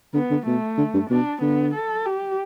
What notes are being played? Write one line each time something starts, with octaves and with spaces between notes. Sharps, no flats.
D3 B3
D3
B2 A3
D3
G2
B2 D4
D3 B3
A4
G4